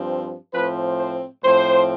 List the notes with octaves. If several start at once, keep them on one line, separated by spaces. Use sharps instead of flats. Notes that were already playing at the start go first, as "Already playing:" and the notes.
Already playing: G2 F3 C4
A2 F3 C4 B4
C5
A2 F3 C4 C5